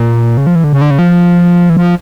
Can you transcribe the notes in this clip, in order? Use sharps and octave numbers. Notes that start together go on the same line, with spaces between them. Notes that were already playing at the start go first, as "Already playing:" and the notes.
Already playing: A#2
C#3
F3
E3
D3
C#3
D3
C#3
F3
E3
F3